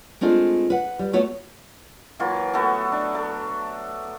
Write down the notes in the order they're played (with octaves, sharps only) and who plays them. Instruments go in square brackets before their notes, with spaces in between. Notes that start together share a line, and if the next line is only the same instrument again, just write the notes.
[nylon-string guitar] G#3 A3 C4 D4 F4
B4 F#5
G3
A3 B3 F#4 C#5
[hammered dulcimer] E3 F#3 A#3 F4
A3 B3 F#4 A4
D4
A3